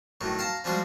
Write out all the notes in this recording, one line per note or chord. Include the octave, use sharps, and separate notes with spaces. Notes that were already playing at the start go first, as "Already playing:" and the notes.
A2 D#3 F#3
F5 A5 A#5
F3 G3 G#3 F#4 G#4